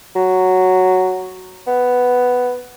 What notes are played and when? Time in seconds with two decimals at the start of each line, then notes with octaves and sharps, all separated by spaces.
0.16 F#3
1.67 B3